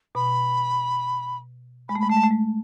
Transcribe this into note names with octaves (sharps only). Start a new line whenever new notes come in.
B2 B5
G#3 B5
A3
G#3 B5
A3 A5
G#3
A3
G#3